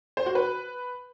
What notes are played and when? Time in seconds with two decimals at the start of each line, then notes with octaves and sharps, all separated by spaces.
0.17 C5
0.26 F#4
0.35 B4